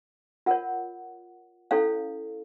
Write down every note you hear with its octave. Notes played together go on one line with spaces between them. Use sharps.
F4 A#4 C#5 F#5
C#4 E4 A4 C#5 F5